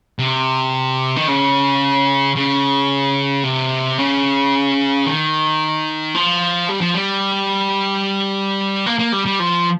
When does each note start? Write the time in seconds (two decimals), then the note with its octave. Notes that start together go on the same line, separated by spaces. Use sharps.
0.19 C3
1.16 D#3
1.28 C#3
2.36 C#3
3.43 C3
3.98 C#3
5.06 D#3
6.15 F3
6.69 G3
6.81 F3
6.94 G3
8.86 A#3
8.99 A#3
9.12 G3
9.26 G3
9.40 F3